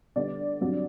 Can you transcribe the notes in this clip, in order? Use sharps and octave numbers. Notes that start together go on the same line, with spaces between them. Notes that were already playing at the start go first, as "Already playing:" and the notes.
D3 G3 B3 D5
G2 F#3 C4